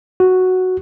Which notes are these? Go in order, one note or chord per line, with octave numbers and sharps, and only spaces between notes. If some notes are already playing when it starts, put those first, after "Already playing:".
F#4